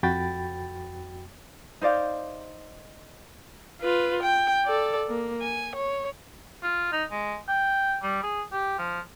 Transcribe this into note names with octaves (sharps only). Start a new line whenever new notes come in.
F2 F#4 G5 B5 A6
D#4 C5 D5 F5
F4 B4
G5
A4 D5
A#3
G#5
C#5
F4
D#4
G#3
G5
G3
G#4
G4
F3